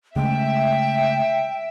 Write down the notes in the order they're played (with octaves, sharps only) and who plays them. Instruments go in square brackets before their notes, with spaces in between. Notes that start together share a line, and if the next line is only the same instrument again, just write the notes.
[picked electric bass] C#3 G#3 A3 [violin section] E5 [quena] G5